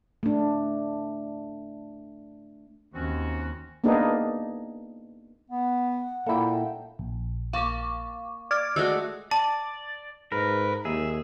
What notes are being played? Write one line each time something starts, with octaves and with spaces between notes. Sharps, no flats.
A3 D4
D#2 C4 C#4 F#4
A#3 B3 D4 D#4 G#4
B3 F#5
A#2 A#3 E4 A4 G5
A#1
A#3 F5 A5 C#6 D6
D5 D6 F6 G#6
G#3 A3 F#4 E6
D5 A5
G#2 A#4 B4
D#2 G#4 E5